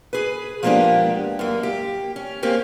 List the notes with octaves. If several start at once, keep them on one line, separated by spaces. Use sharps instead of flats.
G#4 B4
F3 G#3 A#3 B3 D4 G4
F#2 A#3
G4
C#4
A#3 C4 C#4 G4